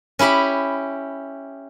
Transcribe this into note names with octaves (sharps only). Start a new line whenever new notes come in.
C#4 E4 G4 B5